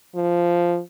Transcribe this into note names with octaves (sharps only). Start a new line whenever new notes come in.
F3